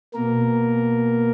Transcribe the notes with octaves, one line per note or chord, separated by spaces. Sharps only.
B2 A#3 A#4